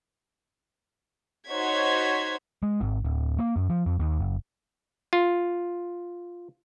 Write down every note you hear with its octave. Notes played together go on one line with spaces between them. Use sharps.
D#4 F#4 C5 C#5 G#6 B6
G#3
G#1
D1
A#3
F#2
F3
F2
D#2
F#1
F4